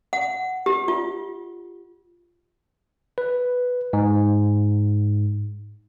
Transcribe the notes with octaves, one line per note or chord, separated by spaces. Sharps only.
F#5
G4
F4
B4
G#2